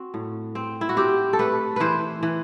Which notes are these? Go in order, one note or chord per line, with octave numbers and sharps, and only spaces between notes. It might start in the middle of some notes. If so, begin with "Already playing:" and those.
Already playing: C4 F#4
A2
C4
E4
F#4
C4 G4
A4
A3 B4
E3 B4 C5
E3